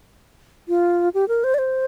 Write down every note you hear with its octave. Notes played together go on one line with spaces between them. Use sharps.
F4
G4
A#4
C5
D5
C5